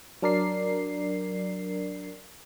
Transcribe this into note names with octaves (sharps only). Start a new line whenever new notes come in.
F#3 D4 A#4 D5 C7